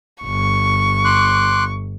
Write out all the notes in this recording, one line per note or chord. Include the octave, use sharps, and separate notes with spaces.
G1 C#6
C6 D6 F#6